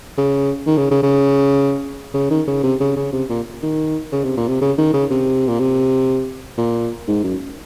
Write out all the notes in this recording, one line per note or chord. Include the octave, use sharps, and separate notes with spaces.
C#3
D#3
C#3
C#3
C#3
C#3
D#3
C#3
C3
C#3
C#3
C3
A#2
D#3
C#3
C3
A#2
C3
C#3
D#3
C#3
C3
A#2
C3
A#2
G#2
F#2